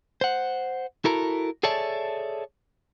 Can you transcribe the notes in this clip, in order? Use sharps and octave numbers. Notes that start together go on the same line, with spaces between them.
C5 F#5
E4 F#4 A4 A#4 A#5
G#4 A4 C#5 D5 E5 A5